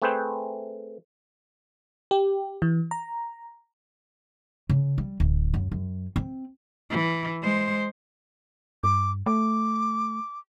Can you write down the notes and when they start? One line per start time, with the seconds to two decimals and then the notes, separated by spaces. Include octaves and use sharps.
0.02 A3 C4 G#4 B4 C5 G5
2.11 G4
2.62 E3
2.91 A#5
4.69 C#3
4.98 G3
5.20 D1
5.54 F#2
5.72 F#2
6.16 C4
6.90 E3
7.42 G#3 C5
8.84 G2 D6
9.26 A3 D6